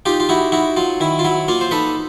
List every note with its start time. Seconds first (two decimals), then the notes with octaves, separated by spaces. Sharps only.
0.06 D#4 F4 G4
0.20 F4
0.29 D#4 E4 F#4
0.52 D#4 E4 F#4
0.77 F#3 F4
1.00 D#3 E4
1.19 F4
1.24 F#3 E4
1.48 A#3 F4
1.61 C5
1.71 D#4 A4 B4